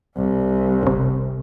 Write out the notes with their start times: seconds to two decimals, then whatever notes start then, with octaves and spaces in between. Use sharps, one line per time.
0.17 C2
0.83 G1 C3